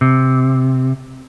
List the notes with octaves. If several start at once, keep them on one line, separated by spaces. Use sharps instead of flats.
C3